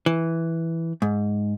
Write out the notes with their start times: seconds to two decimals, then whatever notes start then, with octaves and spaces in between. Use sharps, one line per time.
0.06 E3
1.02 G#2